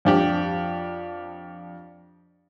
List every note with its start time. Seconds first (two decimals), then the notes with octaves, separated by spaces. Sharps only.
0.05 F2 D4 G4